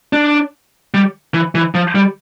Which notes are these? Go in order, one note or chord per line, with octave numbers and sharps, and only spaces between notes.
D4
G3
E3
E3
F3
G3